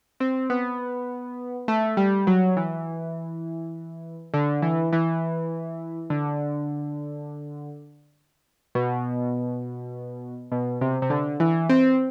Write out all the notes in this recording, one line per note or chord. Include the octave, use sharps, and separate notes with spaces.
C4
B3
A3
G3
F#3
E3
D3
E3
E3
D3
B2
B2
C3
C3
D3
E3
C4